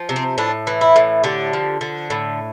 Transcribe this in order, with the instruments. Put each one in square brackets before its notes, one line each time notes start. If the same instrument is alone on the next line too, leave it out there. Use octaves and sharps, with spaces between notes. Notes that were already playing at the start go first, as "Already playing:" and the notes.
Already playing: [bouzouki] F3
C3
C4
A2 D4
E3
E4
A2
D3 G4
F3
D3
A2